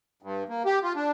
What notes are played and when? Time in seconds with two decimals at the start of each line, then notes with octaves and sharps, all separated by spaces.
0.22 G2
0.49 A#3
0.66 G4
0.83 F4
0.96 D4